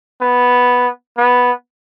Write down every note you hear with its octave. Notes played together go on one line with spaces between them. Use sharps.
B3
B3